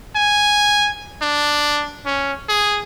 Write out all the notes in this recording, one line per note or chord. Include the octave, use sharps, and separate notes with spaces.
G#5
D4
C#4
G#4